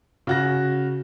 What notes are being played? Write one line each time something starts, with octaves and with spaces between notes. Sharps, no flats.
C#3 F#4 A#6